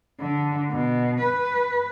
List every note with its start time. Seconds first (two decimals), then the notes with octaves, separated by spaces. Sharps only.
0.20 D3
0.71 B2
1.20 B4